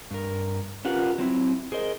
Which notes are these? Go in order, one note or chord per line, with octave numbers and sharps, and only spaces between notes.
G2 A#4
C#4 F4 G4 A#4 B4 F#5
F#3 C4 E4
G#4 A#4 C5 D#5